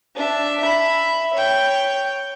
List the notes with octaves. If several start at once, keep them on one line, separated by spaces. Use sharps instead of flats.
D4 E5
E5 B5
C#5 G5